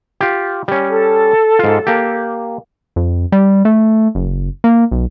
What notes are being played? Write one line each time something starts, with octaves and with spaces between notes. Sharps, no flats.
F4 G4
G3 C#4
A4
G#2 F4
A#3 G4
F2
G3
A3
F#1
A#3
B1